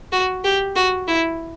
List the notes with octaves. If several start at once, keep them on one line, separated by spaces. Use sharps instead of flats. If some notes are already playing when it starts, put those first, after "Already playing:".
F#4
G4
F#4
E4